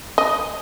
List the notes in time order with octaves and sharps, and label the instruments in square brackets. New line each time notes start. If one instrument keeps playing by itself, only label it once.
[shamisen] D#5